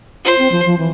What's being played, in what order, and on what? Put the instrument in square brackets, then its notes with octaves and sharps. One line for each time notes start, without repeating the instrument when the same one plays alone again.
[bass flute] F4 [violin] C5
[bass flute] C4
F3
F3
E3